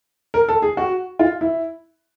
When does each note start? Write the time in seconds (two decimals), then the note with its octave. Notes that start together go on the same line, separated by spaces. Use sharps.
0.34 A#4
0.48 A4
0.62 G#4
0.77 F#4
1.19 F4
1.41 E4